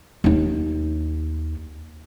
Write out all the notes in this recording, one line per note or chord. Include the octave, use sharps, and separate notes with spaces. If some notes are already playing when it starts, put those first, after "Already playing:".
D#2 D#4